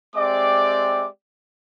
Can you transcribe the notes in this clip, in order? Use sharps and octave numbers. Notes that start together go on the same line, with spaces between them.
G#3 C4 G4 D5 E5 D6